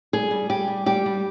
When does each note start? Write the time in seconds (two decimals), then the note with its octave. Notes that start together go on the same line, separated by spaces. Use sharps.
0.13 G3 G#4
0.31 G3
0.49 G3 G4
0.68 G3
0.86 G3 G4
1.06 G3